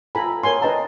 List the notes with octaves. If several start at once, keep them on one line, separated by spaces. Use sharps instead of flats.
F4 A4 G5 G#5 A#5 B5
A4 A#4 C#5 G#5 C6
D4 B4 D#5 G5 A5 A#5